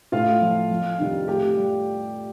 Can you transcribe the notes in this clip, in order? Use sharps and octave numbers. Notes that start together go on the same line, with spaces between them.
A2 F4 F5
F3
F2
C3 D#3 G3
A2 G4 G5
G3